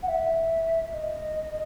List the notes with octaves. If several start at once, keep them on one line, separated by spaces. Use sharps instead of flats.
F#5
E5
D#5